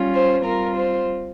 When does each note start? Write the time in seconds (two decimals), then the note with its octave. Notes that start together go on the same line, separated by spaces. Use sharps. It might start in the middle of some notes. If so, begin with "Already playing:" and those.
Already playing: G3 C#4 F4
0.14 C5
0.45 G3 C4 F4 A#4
0.76 C5